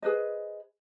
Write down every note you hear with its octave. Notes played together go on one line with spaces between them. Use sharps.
G#4 B4 C5 D#5